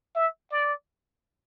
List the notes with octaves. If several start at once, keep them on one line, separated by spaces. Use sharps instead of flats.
E5
D5